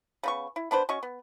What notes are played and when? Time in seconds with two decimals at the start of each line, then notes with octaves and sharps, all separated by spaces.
0.23 C#3 B3 C#6
0.56 E4
0.71 B3 D4 B4 C5
0.89 C#4 F#4 D#5 C#6
1.03 B3